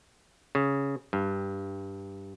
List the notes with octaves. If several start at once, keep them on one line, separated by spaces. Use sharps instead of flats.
C#3
G2